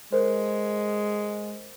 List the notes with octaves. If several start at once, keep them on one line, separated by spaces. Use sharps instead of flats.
G#3 A#4 C5